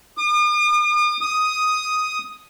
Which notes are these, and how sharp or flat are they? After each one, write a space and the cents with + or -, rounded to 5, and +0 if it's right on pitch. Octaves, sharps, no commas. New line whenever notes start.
D#6 -45
D#6 +5